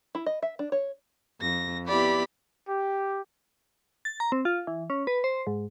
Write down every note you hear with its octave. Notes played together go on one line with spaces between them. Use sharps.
E4
D#5
E5
D4
C#5
F2 A#6
B3 E4 G4 D5 B5
G4
A6
A#5
C4
F4
E3
C#4
B4
C5
G#2